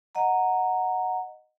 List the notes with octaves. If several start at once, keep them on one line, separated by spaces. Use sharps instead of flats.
D#5 F#5 A#5